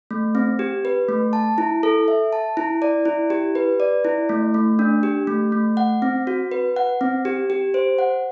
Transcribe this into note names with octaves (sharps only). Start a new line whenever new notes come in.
A3
C4
G4
B4
A3
A5
E4
A4
E5
A5
E4
D5
E4
G4
B4
D5
E4
A3
A3
D4
G4
A3
A3
F#5
C4
F#4
B4
F#5
C4
G4
G4
C5
F#5